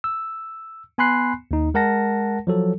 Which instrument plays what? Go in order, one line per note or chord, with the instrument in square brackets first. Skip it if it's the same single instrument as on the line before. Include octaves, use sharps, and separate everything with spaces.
[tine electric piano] E6
B3 G#5 B5 C6 F#6 C7
D#2 D#4
G#3 A#4 F#5 A5 A#6
F3 F#3 A4